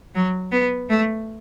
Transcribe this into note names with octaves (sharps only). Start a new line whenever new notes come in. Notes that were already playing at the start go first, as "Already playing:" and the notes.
F#3
B3
A3